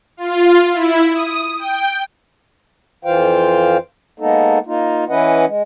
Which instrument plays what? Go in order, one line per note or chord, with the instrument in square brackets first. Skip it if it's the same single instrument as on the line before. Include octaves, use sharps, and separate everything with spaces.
[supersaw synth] F4
E4
D#6
G5
[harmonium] F2 E3 F4 C5 F5 G5
G#3 A#3 B3 D#4 A4
A#3 D#4 F4
E3 C#4 E4 B4 D#5 F#5
G#3